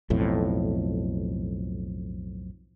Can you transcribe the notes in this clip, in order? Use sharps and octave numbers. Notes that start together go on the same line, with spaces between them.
B1 F2 A2